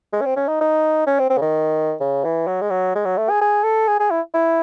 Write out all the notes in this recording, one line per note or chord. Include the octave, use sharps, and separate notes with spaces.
G#3
C#4
C4
C#4
D#4
D#4
C#4
C4
C4
C#3
D#3
C#3
E3
F#3
G#3
F#3
G#3
F#3
A3
G#4
G#4
A4
G#4
G#4
E4
E4